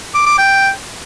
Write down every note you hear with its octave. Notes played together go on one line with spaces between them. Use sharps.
D6
D6
G5